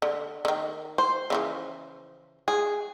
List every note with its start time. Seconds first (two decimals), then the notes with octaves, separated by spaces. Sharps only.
0.02 D3
0.45 D3 D#3
0.98 C5
1.30 C#3 E3 F3
2.48 G#4